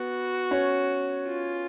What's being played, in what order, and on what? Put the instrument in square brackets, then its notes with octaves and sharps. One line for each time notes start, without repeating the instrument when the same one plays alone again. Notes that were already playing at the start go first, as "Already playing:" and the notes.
Already playing: [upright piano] B3 [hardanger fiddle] F#4
[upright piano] C#4 C#5
[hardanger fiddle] F4